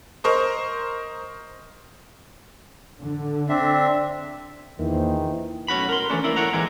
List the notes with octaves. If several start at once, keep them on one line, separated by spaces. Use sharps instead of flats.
A#4 C5 D#5 C#6 D#6
D3
C4 D4 E5
A#1 E2 D#3 E3 A#3 C5
B1 A2 C#4 F#4 B5
A#4 C6
E3 F3 A3 C#4 D4
A#3 E4 A#4
E2 A2 A#4 C#5 F#5 A#5
A#2 D3 E3 G#3 C4